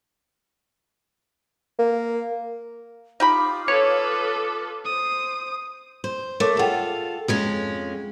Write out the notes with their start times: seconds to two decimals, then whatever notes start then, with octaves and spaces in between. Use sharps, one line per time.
1.79 A#3
3.20 D#4 F4 G4 B5 D6 D#6
3.68 C#4 A4 B4 C#5
4.85 C5 D#6
6.04 C5
6.40 A3 A#4 C#5 D6
6.57 F4 G#4 A4 F#5 G5
7.28 F2 G#3 C#4